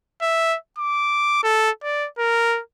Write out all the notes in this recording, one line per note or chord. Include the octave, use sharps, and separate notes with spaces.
E5
D6
A4
D5
A#4